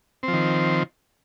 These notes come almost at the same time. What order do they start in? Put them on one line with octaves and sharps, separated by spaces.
C4 F3 D#3